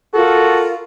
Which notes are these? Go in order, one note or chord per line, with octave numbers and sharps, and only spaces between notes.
F4 F#4 A4 A#4